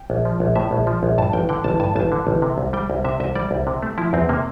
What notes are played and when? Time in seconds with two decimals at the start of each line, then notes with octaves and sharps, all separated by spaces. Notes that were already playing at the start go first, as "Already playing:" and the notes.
Already playing: G5
0.10 A#1
0.25 F3
0.40 A#1
0.56 A2 E5
0.71 A#1
0.87 F3
1.03 A#1
1.18 G2 A5
1.33 A1 G5
1.49 D3 G5
1.64 A1 A5
1.80 G2 A5
1.96 A1 A5
2.12 D3
2.27 A1
2.42 C3
2.58 C2
2.73 G3 G5
2.90 C2
3.04 C3 E5
3.20 C2 E5
3.35 G3 D5
3.51 C2
3.67 C3
3.83 A3
3.98 F3 E4
4.13 E2 C4
4.29 C3 A#3